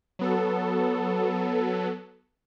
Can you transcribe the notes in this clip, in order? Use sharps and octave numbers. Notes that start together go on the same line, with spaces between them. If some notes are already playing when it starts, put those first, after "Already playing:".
F#3 B3 A4